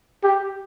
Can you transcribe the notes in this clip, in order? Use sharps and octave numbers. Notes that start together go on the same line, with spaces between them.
G4